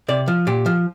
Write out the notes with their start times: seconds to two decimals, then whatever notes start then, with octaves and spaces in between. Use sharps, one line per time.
0.08 C3 D5
0.28 F3
0.47 A#2 G4
0.66 F3